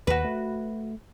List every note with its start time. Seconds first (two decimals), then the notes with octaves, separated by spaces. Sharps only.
0.07 D#2 F#4 B4
0.25 A3